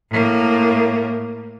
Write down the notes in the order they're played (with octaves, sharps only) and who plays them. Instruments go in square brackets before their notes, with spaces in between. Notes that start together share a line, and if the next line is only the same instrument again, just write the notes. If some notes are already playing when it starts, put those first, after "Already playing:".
[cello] A2 A#3